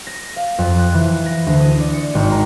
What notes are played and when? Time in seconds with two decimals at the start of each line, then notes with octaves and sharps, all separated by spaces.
0.07 A#6
0.36 F5
0.58 F2
0.79 F#6
0.94 E3
1.26 A#6
1.47 D2
1.60 D#6
1.80 D5
1.93 C#7
2.15 G#1
2.32 A#5